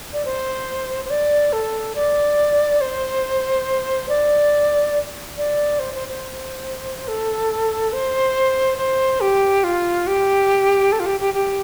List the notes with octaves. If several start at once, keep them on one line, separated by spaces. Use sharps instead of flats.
D5
C5
C5
D5
A4
D5
C5
D5
D5
C5
C5
C5
A4
C5
C5
G4
F4
G4
A4
F4
G4
G4
G4